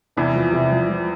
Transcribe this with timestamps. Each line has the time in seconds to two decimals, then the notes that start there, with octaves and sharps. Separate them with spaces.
0.17 E2 C3 E3
0.35 F3
0.53 C3
0.71 F3
0.89 F3